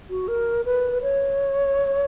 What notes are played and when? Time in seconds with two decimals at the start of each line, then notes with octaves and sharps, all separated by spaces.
0.10 F#4
0.28 A#4
0.65 B4
1.02 C#5